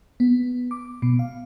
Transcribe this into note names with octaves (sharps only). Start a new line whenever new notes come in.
B3
D6
B2
F5